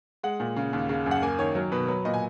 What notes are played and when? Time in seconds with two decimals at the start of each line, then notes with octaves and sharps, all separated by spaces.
0.23 G#3 F#5
0.40 A#2
0.56 C#3
0.73 D#2
0.89 C#3
1.06 F#2
1.11 F#5
1.22 A#3 G#5
1.39 D#3 C#5
1.55 F#3 A#4
1.72 B2 B4
1.88 F#3 B4
2.05 A#2 D#5
2.14 G#5